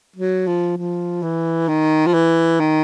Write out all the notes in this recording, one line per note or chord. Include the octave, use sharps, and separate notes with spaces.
F#3
F3
F3
E3
D#3
F3
E3
D#3